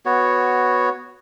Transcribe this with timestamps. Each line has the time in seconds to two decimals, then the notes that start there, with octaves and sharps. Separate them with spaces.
0.06 B3 F#4 C#5